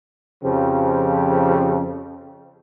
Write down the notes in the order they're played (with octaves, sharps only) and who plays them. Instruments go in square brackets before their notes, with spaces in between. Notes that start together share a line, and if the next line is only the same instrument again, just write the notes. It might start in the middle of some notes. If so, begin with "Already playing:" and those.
[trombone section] F2 C#3 F3 G4